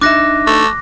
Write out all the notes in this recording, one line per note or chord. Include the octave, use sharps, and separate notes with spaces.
D4 D#4 E5 D6 F#6 A#6
A3